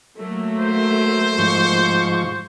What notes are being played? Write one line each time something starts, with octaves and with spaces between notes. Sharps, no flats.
F#3 A3 A#3
C5
G#2 F3 C#6